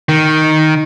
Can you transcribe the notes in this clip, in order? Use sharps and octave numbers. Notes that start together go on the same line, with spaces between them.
D#3